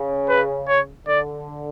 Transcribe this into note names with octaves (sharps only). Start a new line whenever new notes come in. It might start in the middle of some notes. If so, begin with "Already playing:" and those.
Already playing: C#3
B4
C#5
D3 D5